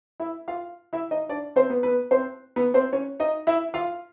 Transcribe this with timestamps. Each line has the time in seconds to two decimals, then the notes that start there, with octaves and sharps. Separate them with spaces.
0.20 E4 E5
0.48 F4 F5
0.93 E4 E5
1.11 D#4 D#5
1.29 D4 D5
1.56 C4 C5
1.70 B3 B4
1.83 B3 B4
2.11 C4 C5
2.56 B3 B4
2.74 C4 C5
2.93 C#4 C#5
3.20 D#4 D#5
3.47 E4 E5
3.74 F4 F5